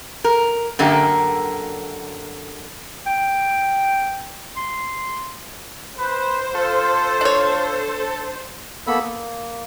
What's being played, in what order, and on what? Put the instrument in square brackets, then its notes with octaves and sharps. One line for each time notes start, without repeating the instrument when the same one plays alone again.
[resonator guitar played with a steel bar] A#4
F#2 D3 A#3 G4
[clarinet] G5
C6
[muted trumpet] B4 [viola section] C5
[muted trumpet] F4 [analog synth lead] A4
[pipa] D4 C#5
[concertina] A#3 B3 A4 B5 E6
A#3